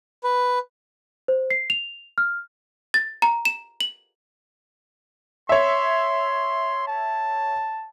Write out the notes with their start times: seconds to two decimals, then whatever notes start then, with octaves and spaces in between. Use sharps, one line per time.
0.24 B4
1.28 C5
1.50 C7
1.70 F7
2.18 F6
2.94 A6
3.22 A#5
3.45 E7
3.80 F#7
5.49 C#5 E5 C6
6.88 A5